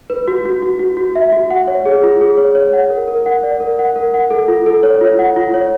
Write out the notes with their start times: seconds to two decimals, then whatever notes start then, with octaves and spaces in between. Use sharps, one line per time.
0.10 B4
0.28 F#4
0.45 F#4
0.62 F#4
0.79 F#4
0.97 F#4
1.15 E5
1.32 F#4
1.50 F#5
1.68 C#5
1.86 G#4
2.03 F4
2.21 G#4
2.37 C#5
2.55 C#5
2.73 F#5
2.90 A#4
3.08 A#4
3.26 F#5
3.43 D5
3.60 A#4
3.79 F#5
3.96 A#4
4.14 F#5
4.30 A4
4.48 F4
4.66 A4
4.83 C#5
5.01 F4
5.19 F#5
5.36 F4
5.54 C#5